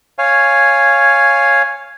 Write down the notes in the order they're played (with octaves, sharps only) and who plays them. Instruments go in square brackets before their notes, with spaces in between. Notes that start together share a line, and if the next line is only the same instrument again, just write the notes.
[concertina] C#5 F5 G#5